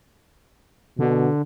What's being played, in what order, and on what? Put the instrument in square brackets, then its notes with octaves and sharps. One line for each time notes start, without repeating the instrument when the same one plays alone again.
[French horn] B2 [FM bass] D3